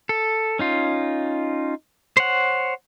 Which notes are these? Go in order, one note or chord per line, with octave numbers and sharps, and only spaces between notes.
A4
C#4 D#4 F4
C5 C#5 F#5